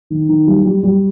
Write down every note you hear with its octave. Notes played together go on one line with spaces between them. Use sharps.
D#3
D#3
G3
G3
G3